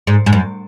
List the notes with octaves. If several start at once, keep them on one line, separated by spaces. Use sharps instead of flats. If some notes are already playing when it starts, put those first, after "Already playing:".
G#2
G#2
F#2